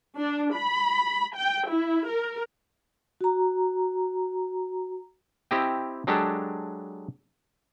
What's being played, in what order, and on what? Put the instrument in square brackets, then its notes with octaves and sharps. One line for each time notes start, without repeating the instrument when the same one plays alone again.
[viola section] D4
B5
G5
E4
A#4
[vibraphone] F#4 A#5
[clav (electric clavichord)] C4 E4 G4 D#5 G5
F#3 G#3 D4 G4 A4